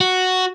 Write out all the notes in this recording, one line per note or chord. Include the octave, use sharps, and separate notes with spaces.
F#4